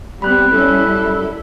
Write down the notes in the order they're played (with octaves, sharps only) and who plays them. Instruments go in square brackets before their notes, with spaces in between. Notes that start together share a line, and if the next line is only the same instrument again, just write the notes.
[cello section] G3 B3 C4 [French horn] G4 [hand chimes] B5 F#6
[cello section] G3 E4 [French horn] C#4 [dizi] A4
[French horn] F#2